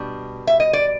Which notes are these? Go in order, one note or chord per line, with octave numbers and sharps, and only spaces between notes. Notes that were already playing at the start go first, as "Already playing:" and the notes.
Already playing: B2 G3 D4 D5
E5
D#5
D5